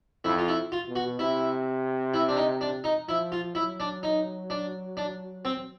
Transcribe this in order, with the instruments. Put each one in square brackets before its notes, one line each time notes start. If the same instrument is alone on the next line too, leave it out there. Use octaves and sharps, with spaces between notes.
[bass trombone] F2 [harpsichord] E4
[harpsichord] F4
E4
F4
[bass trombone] B2
[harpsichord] F#4
[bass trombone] C3 [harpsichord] E4
[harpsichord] E4
D4
D#4
D4
D#4
[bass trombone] F3 [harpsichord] E4
[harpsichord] F4
[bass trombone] F#3 [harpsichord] E4
[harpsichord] D4
D#4
D4
D4
C4